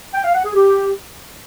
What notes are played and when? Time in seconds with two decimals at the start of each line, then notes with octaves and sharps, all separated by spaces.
0.14 G5
0.24 F5
0.34 F#5
0.45 G#4
0.55 G4